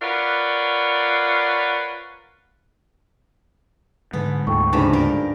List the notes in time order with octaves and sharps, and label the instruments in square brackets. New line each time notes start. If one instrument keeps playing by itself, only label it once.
[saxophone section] F4 A#4 B4 C#5 D5 F#5
[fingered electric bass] G#2 [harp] D3 [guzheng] B3
[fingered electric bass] D2 G#2 [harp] F4 A4 [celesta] G5 C#6
[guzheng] G2 C#3 [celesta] D#4 F4 C5 [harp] A4 F5 B5
[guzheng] G3 A#4